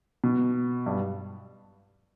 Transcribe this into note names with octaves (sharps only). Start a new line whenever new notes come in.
B2
G2